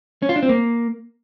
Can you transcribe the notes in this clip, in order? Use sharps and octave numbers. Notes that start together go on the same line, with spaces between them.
C#4
F4
D4
C4
A#3